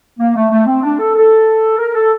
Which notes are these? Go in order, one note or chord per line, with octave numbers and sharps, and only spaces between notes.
A#3
A3
A3
C4
D4
A4
A4
A#4
A4